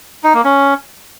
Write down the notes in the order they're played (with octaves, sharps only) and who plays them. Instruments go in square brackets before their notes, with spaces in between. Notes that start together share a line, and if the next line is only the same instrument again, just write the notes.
[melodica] D#4
A#3
C#4